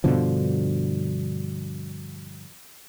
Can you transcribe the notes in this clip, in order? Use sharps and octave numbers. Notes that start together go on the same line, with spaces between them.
G2 B2 D3 F3